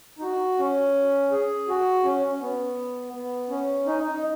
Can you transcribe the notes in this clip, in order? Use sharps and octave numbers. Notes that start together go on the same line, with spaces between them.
D#4
F#4
C#4
G#4
F#4
C#4
C#4
B3
B3
C#4
D#4
D#4